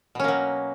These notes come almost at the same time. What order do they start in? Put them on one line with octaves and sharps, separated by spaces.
B2 C#4 A#3 F#3